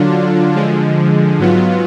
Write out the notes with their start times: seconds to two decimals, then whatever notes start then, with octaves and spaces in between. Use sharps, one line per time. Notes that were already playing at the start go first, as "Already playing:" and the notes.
Already playing: D3 F#3 D4 F4
0.56 D3 F3 G#3
1.39 G#2 F#3 B3 F4